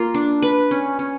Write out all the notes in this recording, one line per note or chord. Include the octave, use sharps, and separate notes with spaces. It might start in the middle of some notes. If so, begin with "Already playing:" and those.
Already playing: A#3 F4
D4
B4
C#4
C#4